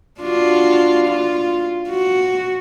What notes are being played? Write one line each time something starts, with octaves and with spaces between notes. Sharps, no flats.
D4 F4 F#4
F4
F#4